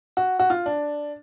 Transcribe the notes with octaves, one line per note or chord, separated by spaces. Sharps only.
F#4
F#4
F4
D4